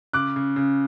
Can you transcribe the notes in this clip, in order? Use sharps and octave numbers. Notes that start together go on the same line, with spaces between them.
C#3 D6 F#6
C#3
C#3